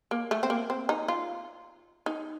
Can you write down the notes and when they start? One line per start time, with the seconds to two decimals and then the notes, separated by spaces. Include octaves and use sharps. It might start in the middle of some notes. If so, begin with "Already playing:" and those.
0.11 A#3
0.31 A3
0.43 C4
0.50 A#3
0.70 C4
0.89 D#4
1.08 F4
2.06 D#4